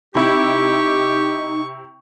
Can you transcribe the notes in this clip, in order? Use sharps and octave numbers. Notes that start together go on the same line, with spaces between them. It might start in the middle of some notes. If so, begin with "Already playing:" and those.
C3 D#4 E4 G4 C#6